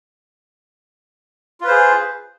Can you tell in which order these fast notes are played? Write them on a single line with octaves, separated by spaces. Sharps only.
F4 B4 C5 G#4